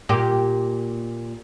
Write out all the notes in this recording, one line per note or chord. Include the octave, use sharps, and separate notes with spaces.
A#2 G4